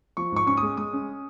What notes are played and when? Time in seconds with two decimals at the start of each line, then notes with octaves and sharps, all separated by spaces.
0.17 F3 C#6
0.32 G#2 C#6
0.47 C#4 C#6
0.57 D#6
0.63 G#3
0.77 G#3 D#6
0.93 C#4